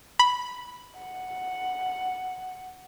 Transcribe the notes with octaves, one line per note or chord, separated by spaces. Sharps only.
B5
F#5